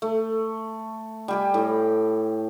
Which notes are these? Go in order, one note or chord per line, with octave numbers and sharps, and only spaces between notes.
A3
G3 G4 G#5
A2